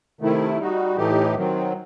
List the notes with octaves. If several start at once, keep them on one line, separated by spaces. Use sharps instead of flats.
C3 D#3 A3 E4
G3 D#4 F#4
A2 E3 A3 D#4 G4
D#3 F#3 C4